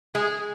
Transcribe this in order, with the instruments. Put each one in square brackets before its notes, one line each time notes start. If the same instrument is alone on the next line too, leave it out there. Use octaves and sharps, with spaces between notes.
[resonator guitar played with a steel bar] G#3 [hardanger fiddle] G#4